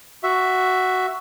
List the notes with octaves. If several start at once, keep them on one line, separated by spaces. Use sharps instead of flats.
F#4 E5